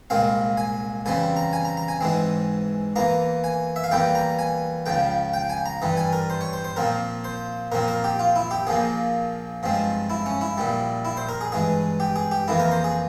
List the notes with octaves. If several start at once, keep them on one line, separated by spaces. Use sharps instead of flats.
C2 A#2 G#3 C4 F5
G#5
E2 C#3 G3 C4 G#5
A#5
G#5
A#5
A#5
G#5
G#2 E3 G#3 C4
E2 E3 A#3 A#5
G#5
E5
F5
E2 E3 G3 A#3 G5
A#5
G#5
C#2 C#3 F3 G5
G5
G#5
A#5
G2 E3 G3
G#5
A#4
C5
C#5
C5
C5
A#2 F3 C4 A#4
C5
A#2 F3 C4 A#4
A#4
G4
F4
E4
G4
A#1 A#2 F3 A#3 G#4
G2 F3 G#3 C4
E4
C#4
E4
A#1 A#2 G3
E4
C5
A#4
G#4
G2 E3 G#3 G#4
G4
G#4
G4
F2 E3 A#3 E4
A#4
C5
G#4